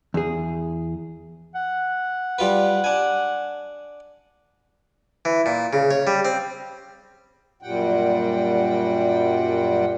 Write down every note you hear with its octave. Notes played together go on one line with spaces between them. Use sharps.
E2 G#4
F#5
G3 F4 B4
D4 G#5
E3
A#2
C#3
C#5
G3
C4
F#2 A#2 G3 F#5 G5